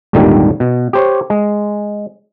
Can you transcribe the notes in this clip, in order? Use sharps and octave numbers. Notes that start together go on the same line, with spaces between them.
G#1 D#2 A#2 D3 D#3 G3
B2
G4 C5 C#5
G#3